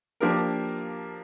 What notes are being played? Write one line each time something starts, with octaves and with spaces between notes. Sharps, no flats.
F3 A#3 D4 G4 A#4